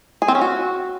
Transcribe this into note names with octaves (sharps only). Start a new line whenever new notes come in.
G#4
C4
C#4
F#4